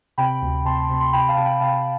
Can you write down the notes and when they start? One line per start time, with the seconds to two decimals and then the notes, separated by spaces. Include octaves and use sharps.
0.18 C3 G5 B5
0.42 D2
0.65 C3 A5 C6
0.90 C3
1.00 C6
1.13 C3 G5 B5
1.29 F5 A5
1.37 C3
1.45 G5 B5
1.60 C3 F5 A5